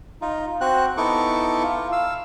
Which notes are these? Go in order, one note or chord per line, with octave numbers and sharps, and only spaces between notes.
D#4 F4
C4 F#4 F#6
B3 D#4 E4 A4 C#6 D6
F4
F5 E6